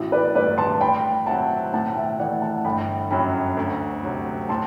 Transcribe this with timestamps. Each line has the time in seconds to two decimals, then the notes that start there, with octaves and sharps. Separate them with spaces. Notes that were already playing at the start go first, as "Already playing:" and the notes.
Already playing: A1 E4 F#4 G4
0.12 B4 D5
0.35 G2 D3 A3 B4 D5
0.58 A5 C6
0.81 A2 G5 B5
1.26 F#3 C4 E4 F#5 A5
1.73 A2 F#5 A5
1.96 E5 G5
2.19 E3 A3 D5 F#5
2.42 F#5 A5
2.65 G1 G5 B5
3.11 F#2 F#3 G5 B5
3.57 D2
4.04 C3 F#3
4.49 A2 A5 C6